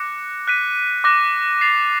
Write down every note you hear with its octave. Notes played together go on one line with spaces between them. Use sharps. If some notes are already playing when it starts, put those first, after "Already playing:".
Already playing: D6 F#6 A#6 C#7
F#6 B6 D#7
D6 F#6 A#6
A6 C7 F7